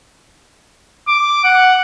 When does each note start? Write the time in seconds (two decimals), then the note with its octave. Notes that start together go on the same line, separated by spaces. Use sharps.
1.08 D6
1.44 F#5